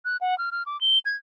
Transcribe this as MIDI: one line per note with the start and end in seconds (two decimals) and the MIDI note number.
0.05 0.17 90
0.21 0.37 78
0.38 0.50 89
0.52 0.63 89
0.66 0.79 86
0.81 0.99 103
1.05 1.16 92